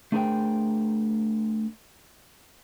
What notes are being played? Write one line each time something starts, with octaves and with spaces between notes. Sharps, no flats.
A3 D4 G#4 A#4 C5 G5